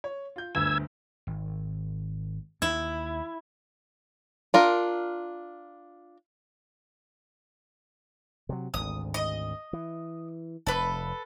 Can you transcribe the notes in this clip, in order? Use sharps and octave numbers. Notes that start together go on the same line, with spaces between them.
C#5
F4 G6
G1 D2 E6 G#6
G#1
D#2 E4
D4 F4 A#4
C3 F#3
G#1 D2 D#6
D#5
E3
F1 A4 B4